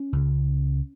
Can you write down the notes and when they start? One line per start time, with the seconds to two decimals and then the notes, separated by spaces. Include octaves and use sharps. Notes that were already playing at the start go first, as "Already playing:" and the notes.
Already playing: C#4
0.13 C#2 C#3